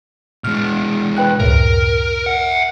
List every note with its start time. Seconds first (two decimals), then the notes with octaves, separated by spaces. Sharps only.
0.44 B2 G#3 F6
1.17 B4 G5 F#6
1.40 C#2 F#2 A2 A#4
2.26 E5 F#5